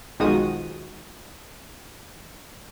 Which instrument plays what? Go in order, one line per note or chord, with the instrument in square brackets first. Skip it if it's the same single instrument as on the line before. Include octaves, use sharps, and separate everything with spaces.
[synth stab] B1 D#3 F3 G#3 F#4 D#6